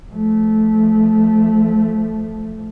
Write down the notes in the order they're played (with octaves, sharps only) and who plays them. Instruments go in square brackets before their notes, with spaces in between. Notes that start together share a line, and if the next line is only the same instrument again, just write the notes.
[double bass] F3 A3